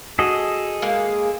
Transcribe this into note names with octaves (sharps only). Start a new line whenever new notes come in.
F#4 G#4 A4 D#5
G#3 A#3